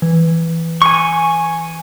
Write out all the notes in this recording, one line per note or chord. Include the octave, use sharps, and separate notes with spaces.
E3
G#5 C#6